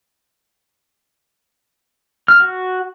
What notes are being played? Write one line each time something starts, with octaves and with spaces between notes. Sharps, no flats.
F6
F#4